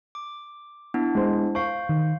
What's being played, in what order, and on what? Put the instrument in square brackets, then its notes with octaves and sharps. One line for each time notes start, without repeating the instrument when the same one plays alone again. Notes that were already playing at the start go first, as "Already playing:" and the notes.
[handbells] D6
B3 D4 E4
[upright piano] G#3 C5
[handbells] C5 F5 [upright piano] C#6
[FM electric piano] D#3